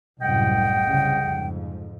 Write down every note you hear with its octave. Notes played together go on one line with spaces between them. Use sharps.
C2 F#2 A2 D#5 F#5 G5
C2 C#3
F2 G#2